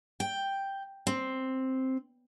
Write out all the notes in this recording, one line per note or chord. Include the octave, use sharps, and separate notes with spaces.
G5
C4